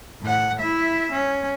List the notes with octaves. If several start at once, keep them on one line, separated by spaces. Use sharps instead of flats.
A2 F#5
E4 E5
C#4